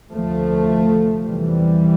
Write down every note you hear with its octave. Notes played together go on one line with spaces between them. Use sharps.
D2 C3 F3 A3
E2 C3 E3 G3